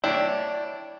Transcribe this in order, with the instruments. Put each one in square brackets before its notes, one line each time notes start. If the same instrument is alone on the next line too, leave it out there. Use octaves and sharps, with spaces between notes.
[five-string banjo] D4 E4 [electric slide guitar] C#5 D5 G5